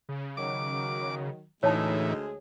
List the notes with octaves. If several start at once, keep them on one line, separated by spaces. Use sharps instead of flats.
C#3
D#3 F#3 D6
D2 A2 E3 G#3 D#4 G#4 C#5 A5